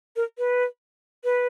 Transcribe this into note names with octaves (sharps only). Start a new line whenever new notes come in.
A#4
B4
B4